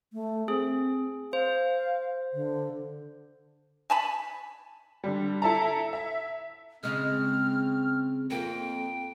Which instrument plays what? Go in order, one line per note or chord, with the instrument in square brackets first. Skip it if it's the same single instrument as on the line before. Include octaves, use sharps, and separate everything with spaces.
[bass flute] A3
[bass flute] C4 [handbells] G#4
[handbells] C5 [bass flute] F5
[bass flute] D3
[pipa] G#5 A5 B5
[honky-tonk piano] D3 G3
E4 A4 E5 A5 A#5
E5
[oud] C#3 G#3 [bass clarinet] C4 [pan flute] F6
[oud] F2 A#3 [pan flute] G5